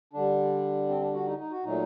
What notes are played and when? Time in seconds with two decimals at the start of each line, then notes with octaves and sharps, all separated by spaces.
0.13 D3 G3 D4
0.89 C4
1.01 D4
1.14 F#4
1.26 D#4
1.39 D#4
1.51 F#4
1.64 A#2 F#3 A3 D#4